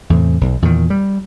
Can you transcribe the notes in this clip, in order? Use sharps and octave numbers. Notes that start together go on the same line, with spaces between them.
E2 A2 C3
B1
E2 A#2 D#3
G3